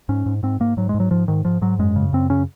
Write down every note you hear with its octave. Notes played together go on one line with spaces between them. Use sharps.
G#2 C#4
G#2
G#2 C4
G#2 A#3
G#2 F#3
G#3
G#2
F#3
G#2 F3
G#2 D#3
G#2 F3
G#2 F#3
F#2 G#3
C#3
F#2 C4
C#3 C#4